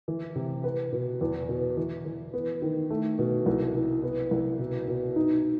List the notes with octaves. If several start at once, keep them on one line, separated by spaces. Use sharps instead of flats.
E3
C3
B4
B2
E2
B2
E3
E3
B3
D#3
A3
B2
C2
C2
B3
C2
B2
B2
D#4